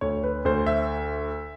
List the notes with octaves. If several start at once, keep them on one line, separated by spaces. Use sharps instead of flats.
D2 C#5
B4
D2 C5
E5